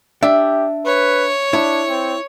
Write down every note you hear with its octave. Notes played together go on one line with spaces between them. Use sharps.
D4 G4 E5
B4 C#5
D4 E4
C4